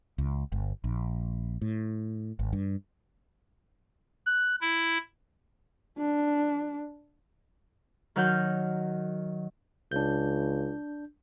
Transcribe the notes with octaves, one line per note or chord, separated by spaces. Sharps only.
C#2
G1
A#1
A2
G#1
G2
F#6
E4
D4
D#3 F#3 A#4 F#5 F6 G6
C#2 D4 G6